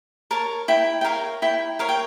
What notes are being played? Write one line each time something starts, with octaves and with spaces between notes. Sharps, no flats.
A#4 C#5 A5
E4 G5
G5
A#4 C#5 F5
E4 G5
A#4 C#5 F5
G5